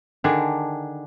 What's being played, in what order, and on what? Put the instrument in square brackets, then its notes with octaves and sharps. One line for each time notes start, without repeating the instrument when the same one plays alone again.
[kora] D3 D#3 D4 G#4